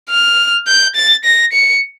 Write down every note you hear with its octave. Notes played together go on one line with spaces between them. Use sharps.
F6
G6
A6
A#6
C#7